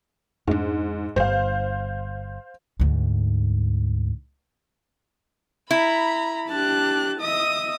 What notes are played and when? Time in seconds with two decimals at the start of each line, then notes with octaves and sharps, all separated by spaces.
0.47 F2 G#2 D4
1.16 G1 G2 C5 F5
2.80 D2 G#2
5.71 E4 A#5 B5
6.49 D4 G4 A5 F#6
7.21 D#5 E5 D#6